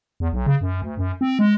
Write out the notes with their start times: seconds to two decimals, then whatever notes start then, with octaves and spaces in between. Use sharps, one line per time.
0.20 E2
0.33 B1
0.46 C#3
0.61 F#2
0.82 D2
0.97 F#2
1.21 C4
1.39 G#3